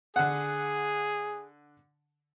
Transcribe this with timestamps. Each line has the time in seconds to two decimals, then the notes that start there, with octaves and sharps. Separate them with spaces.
0.16 D3 G#4 F#5